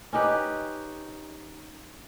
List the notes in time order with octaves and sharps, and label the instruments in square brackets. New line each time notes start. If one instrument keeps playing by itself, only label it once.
[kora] C#4 D#4 G4 B4